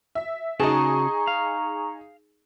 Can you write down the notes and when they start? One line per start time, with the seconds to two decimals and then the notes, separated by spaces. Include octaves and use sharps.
0.15 E5
0.60 C#3 D#4 F#4 G#4 A5 A#5 C#6
1.27 F5